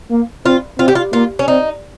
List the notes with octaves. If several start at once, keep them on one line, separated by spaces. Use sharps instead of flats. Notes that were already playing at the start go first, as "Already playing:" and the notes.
A#3
C4 F4
C4 F4
G4
F4
A#3 F4
C#4
C4 D#4